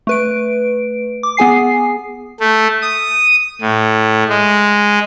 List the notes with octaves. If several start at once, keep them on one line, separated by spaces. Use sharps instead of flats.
A3 B4 D7
D6
B3 G#4 G#5 C7
A3
D#6
A2
G#3